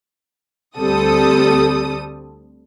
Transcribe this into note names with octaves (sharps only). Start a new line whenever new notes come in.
D2 G3 C4 A4 D#6